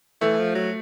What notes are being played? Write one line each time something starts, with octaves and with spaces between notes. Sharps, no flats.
E3 A3
F3
F#3